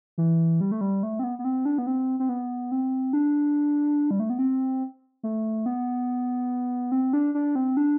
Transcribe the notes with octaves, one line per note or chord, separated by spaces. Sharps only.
E3
G3
A3
G3
A3
C4
B3
B3
C4
D4
B3
C4
C4
B3
C4
D4
G3
A3
B3
C4
A3
B3
C4
D4
D4
C4
D4